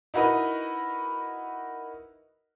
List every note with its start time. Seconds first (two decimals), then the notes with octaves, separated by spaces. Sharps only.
0.14 D#4 E4 F#4 A#4 B4 D#5